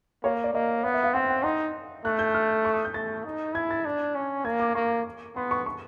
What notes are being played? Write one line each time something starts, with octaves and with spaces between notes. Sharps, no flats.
A#3 C#5
D5
A#3 D#5
B3 F5
E5
F5
C4 F#5
G5
D#4 C6
A3 F#6
G6
F6
C#6
D#6
G6
A3 A6
D#4
E4 G#6
A6
D4
C#4
A#3 G#6
D6
A#3 C#6
B3 C6
C#6
C#6